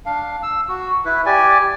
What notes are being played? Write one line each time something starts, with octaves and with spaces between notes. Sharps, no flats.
D4 F5
E6
F#4
E4 B4
G4 D5 G#5